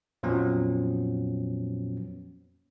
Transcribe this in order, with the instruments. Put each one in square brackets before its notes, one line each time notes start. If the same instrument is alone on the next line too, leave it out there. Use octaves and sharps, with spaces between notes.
[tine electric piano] F2 A#2 F3 F#3 B3 C#4